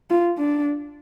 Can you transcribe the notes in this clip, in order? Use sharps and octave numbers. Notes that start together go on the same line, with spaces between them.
F4
D4